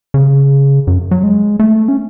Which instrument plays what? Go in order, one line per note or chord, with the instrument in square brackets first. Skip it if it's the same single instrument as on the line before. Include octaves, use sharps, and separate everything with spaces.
[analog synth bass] C#3
F#2
F#3
G#3
A3
C#4